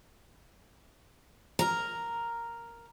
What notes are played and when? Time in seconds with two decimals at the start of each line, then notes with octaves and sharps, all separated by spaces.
1.59 A#4 A#5